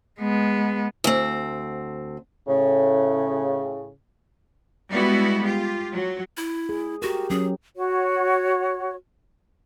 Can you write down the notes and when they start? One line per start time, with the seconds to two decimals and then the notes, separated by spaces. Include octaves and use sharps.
0.19 G#3 B3
1.04 D2 C4
2.48 A2 C#3
4.90 G3 G#3 B3 E4 F#4
5.44 F4 G4
5.92 F#3
6.37 E4
6.69 G#4
7.02 F#4 G4 A#4
7.30 F#3 C#4 G#4
7.76 F#4 C#5